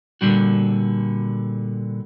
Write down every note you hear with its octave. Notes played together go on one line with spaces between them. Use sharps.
A#2 D3 G3 F#4